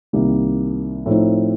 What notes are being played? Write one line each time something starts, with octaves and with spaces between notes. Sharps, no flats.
C2 C3 D#3 A#3
A2 F3 C4 D#4